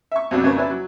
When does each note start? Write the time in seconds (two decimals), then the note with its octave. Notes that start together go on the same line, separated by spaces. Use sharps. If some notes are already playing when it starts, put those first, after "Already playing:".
0.12 E5 C#6
0.31 F2 B2 F#3 C4 D4
0.44 F2 C#3 A#3 B4 C#5 C#6
0.56 C#4 D4 E4 B4 D5
0.70 F#3